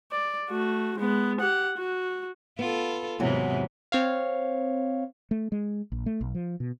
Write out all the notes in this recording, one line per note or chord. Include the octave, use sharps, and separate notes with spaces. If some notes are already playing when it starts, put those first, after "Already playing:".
D5
A3 F#4
G#3 B3
G4 F#5
F#4
B3 F4 A4
E2 G#2 C3 E3 F#3
C4 C#5 F5
A3
G#3
A#1
A3
B1
F3
B2